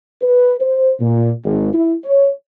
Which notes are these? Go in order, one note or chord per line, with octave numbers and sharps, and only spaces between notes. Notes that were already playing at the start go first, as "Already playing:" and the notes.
B4
C5
A#2
G#1
E4
C#5